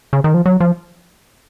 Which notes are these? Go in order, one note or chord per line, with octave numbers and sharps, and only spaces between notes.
C#3
D#3
F3
F#3
F3